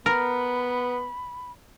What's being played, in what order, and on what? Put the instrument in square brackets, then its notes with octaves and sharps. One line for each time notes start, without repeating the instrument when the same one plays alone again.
[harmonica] B3 [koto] A#4 [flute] B5